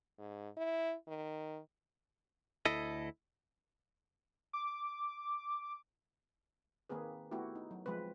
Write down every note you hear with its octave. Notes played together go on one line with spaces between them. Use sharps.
G#2
E4
D#3
D2 E4 A4 D#5
D6
D#3 A#3 C4 G#4 B4
A3 B3 E4 F#4 G4
D#4
F#3
F3 G#3 C4 B4